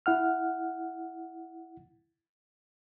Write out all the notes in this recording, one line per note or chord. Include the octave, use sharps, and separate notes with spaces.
E4 F#5 F6